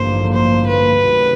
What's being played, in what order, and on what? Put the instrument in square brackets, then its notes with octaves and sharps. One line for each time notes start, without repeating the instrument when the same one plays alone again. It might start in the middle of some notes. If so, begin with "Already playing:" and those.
Already playing: [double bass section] A1 G2 D3 F3 A#3 [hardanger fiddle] C5
[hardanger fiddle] C5
B4
[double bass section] C#2 C3 D#3 F#3 A3